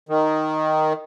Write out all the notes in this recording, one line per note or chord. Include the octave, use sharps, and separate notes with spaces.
D#3